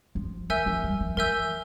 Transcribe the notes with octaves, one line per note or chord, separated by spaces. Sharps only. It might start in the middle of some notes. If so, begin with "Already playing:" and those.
F3
E3 A#4 E5 G#5 E6 G6
F3
G3
F3
E3 A#4 E5 G#5 E6 G6